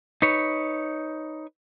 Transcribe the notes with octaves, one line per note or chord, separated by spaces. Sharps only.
D#4 B4 C#5